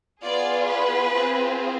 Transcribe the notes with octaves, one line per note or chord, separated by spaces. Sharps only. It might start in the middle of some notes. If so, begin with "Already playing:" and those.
B3 F4 G#4 D5
B4
C4 F4 G#4